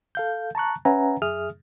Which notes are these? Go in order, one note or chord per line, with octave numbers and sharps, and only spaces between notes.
A4 F5 G6
A5 A#5 C#6 F#6
C#4 B4 E5 F#5 G#5 A#5
F#2 G#4 E5 D#6 F6